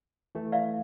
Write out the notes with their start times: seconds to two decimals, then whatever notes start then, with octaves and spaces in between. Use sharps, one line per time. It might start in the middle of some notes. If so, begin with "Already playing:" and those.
0.35 E3 A3
0.52 D5 E5 F5